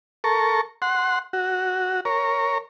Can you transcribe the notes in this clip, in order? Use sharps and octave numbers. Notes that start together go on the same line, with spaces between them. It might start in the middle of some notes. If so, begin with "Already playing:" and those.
A4 A#4 C#6
F#5 C6
F#4
A#4 C#5